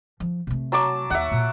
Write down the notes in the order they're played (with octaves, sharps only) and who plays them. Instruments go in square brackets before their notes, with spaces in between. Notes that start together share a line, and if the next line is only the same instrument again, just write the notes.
[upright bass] F3
C3 A3
[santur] F#3 A5 D6
[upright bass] D#2 D#4 [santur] E5 F#5
[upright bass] A#2